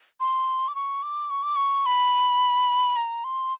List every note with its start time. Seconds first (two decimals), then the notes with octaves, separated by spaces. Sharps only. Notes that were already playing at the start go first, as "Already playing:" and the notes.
0.20 C6
0.68 D6
0.75 C#6
1.03 D6
1.30 C#6
1.43 D6
1.56 C#6
1.86 B5
2.96 A#5
3.24 C6